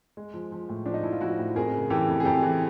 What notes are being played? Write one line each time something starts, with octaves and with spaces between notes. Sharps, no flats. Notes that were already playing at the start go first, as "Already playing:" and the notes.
G#3
F3
F3
A2
F3 D4
D#4
F3 E4
F4
F3 E4 F#4
A2
F2 G#4 A#4
C#3
E3 G4 A4
F2
G#4
F2 G4 A4
E3